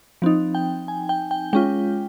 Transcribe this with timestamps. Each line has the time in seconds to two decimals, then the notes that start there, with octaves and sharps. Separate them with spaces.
0.22 F3 C4 D#4
0.55 G5
0.88 G#5
1.09 G5
1.31 G5
1.53 G#3 C#4 F4 G5